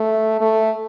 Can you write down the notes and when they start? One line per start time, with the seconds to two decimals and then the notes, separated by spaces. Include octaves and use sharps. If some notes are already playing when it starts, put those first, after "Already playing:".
Already playing: A3
0.40 A3